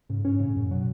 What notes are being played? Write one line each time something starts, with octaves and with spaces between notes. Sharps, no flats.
G#2 C#3
G#2 C#4
A2 C#3
F#2 A2
B2 F#3